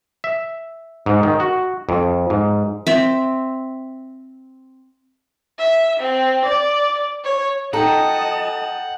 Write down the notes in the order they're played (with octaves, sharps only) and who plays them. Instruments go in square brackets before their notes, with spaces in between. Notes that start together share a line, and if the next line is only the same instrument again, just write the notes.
[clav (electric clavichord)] E5
G#2
D#3
F#4
F2
G#2
[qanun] C4 E5
[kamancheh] E5
C4
D5
C#5
[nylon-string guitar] D#4 A4 [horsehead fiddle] D#5 A5 [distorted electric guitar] F#5 [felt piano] G5 A#5